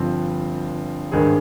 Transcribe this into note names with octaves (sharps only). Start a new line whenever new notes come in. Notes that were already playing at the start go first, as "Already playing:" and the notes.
Already playing: G1 G2 F3 C4
G#1 G2 D#3 G#3 G#4